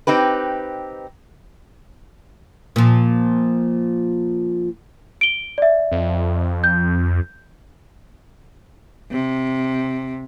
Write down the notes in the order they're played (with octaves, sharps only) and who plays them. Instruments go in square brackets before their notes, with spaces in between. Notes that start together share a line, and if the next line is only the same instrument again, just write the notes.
[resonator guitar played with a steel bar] C4 D#4 G4 B4
[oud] A#2 F3
[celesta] D7 G7
D5 E5
[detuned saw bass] F2
[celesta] G6
[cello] C3